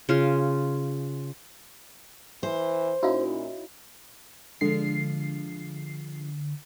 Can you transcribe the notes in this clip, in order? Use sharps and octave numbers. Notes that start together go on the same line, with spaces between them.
C#3 F4 C6
E3 C5
A#2 C#4 D#4 E4 F#4 F5
D3 F3 G#3 C7